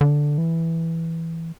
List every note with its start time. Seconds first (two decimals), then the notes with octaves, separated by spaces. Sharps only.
0.01 D3
0.38 E3